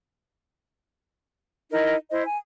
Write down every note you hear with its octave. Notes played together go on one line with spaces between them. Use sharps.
D#4 E4 A#4 D#5
E4 C5 D#5
G#5